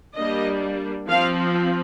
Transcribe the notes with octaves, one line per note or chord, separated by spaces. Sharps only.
G3 A#3 D4 D#5
F3 C4 F5